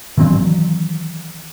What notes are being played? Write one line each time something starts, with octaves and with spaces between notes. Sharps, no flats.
D#3 E3 F#3 C4